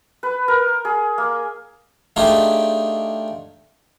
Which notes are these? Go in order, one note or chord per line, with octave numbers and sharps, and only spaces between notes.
B4
A#4
G#4
A#3
A3 D4 D#4 F4 G4 G#4